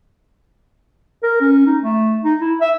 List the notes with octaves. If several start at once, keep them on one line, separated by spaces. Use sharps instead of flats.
A#4
C#4
D#4
A3
D#4
E4
E5